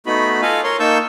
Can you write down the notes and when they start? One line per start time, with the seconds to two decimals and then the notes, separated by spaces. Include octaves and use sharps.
0.06 A3 B3 D#4 F#4 B5
0.42 F4 A4 D#5 F5 G#5
0.64 A#4 C#5 C6
0.80 A#3 D#4 A5 C#6 E6 G6